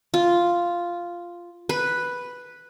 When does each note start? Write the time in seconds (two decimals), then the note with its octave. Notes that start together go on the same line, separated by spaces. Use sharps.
0.14 F4
1.69 B4